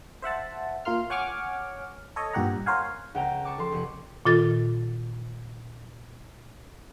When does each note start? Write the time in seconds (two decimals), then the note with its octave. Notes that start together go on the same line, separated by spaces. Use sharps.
0.22 C5 E5 F#5 A5
0.85 A#2 F4 A#4 C6 F6
1.10 C#5 F#5 G#5 C#6 D6 F6
2.16 A4 C#5 D#5
2.33 G2 A#2 G4 F#5 A#5
2.66 A#4 C5 C#5 F5 F#5 G#5
3.15 C#2 F#5 G5 A#5
3.45 A5 C#6 D6
3.58 F3 A4 C6
3.72 F1 F#5
4.25 A#2 D#3 F4 A4 A6